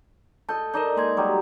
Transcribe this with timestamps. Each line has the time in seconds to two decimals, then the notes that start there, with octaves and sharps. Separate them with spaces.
0.49 A4 D#5 A5 G6
0.74 D#4 A#4 D5 D#5 G6
0.97 G#3 A#3 C6 G#6
1.17 F#3 G3 G4